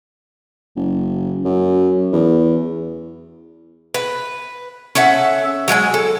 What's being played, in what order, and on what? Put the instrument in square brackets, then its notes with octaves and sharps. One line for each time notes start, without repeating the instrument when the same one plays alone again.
[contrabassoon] F#1
F#2
E2
[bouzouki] B4
C#4 A4 E5 F#5
F#3 G#3 E5 G#5
A4